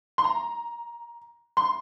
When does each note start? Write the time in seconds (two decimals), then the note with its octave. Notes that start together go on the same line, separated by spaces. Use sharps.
0.18 C6
0.24 A#5
1.57 C6